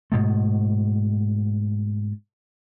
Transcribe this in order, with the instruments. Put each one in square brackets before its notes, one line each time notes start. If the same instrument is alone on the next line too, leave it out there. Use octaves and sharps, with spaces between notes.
[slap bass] G#2 B2 A3